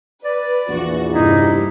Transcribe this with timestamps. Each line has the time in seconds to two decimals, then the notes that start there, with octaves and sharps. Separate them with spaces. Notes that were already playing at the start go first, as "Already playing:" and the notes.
0.25 B4 D5
0.69 A#1 E2 F#4
1.15 G2 C3 G3 D#4 E4